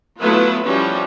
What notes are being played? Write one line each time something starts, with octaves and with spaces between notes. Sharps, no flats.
F#3 A3 B3 E4 F4 B4
F3 G3 C#4 E4 F#4